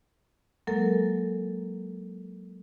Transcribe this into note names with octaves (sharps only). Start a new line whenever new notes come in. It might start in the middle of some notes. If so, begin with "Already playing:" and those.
F#3 G#3 A#3 A4 A#4